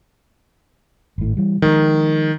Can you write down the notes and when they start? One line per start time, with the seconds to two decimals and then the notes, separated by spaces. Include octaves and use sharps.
1.18 G#1 A2
1.37 E3 G3
1.62 D#3 F3 G#3